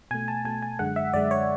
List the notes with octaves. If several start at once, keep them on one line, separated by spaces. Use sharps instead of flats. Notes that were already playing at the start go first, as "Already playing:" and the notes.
B2 A3 G#5
A5
B2 A3 G#5
G#5
F#2 D3 G#3 F#5
E5
F#2 D3 G#3 D5
C#5